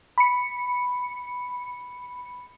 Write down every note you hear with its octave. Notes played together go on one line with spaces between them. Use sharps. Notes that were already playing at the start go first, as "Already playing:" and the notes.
B5 C#7